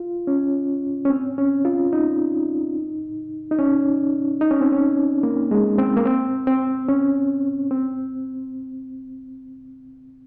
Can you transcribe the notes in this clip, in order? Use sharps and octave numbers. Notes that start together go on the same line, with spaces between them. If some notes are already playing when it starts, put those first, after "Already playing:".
Already playing: F4
C#4
C#4
C4
C#4
F4
D#4
D#4
C#4
D#4
C#4
C4
C#4
A#3
G#3
C4
A#3
C4
C4
C#4
C4